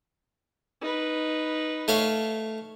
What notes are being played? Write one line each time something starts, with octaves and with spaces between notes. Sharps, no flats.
D#4 B4
A3 C#5 F5